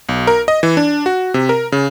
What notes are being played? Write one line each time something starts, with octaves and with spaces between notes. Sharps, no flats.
B1
A#4
D#5
E3
D4
F#4
C3
A#4
C#3